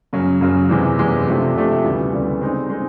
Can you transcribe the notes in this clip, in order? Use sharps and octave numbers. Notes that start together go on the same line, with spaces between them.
F#2 C#3 F#3
F#2 C#3 F#3
E2 C3 E3 G#3
E2 C3 E3 G#3
C3 F3 A3 D4 G4
C3 F3 A3 D4 G4
D2 C#3 E3 G3 B3
D2 C#3 E3 G3 B3
G#3 C4 D#4
G#3 C4 D#4